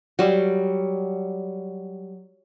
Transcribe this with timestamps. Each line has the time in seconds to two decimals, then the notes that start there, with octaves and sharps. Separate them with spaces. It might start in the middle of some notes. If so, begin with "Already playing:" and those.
0.19 F#3 G3